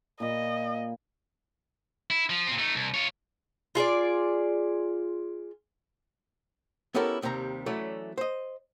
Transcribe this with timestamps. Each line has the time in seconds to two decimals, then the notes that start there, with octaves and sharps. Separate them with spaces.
0.20 A#2 D#5 B5
2.10 E4
2.30 F3
2.47 A#2 C4
2.59 A3 D#4
2.75 C2
2.94 F4 C#5
3.75 F4 G#4 C5 D5
6.94 B3 C#4 E4 G4 A4 A#4
7.22 D#2 C3 D#3 G3 A#5
7.66 E3 F#3 A3 C#4 E4 D5
8.18 C5 D#5